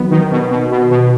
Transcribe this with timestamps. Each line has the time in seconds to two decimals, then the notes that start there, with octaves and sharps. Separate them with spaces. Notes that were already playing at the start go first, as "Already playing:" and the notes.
Already playing: D#3 F#3 B3
0.11 D#3
0.32 B2
0.51 B2
0.72 B2
0.91 B2